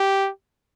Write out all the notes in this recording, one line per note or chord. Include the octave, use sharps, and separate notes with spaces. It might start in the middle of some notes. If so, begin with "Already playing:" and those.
Already playing: G4